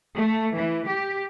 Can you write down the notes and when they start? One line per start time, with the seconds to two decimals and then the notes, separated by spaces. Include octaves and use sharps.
0.17 A3
0.55 E3
0.86 G4